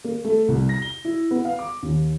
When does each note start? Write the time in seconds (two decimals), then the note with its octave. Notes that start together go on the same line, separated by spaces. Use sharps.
0.04 A#3
0.24 A3
0.48 C2
0.69 A#6
0.82 G7
1.05 E4
1.31 B3
1.45 F5
1.59 D6
1.83 D#2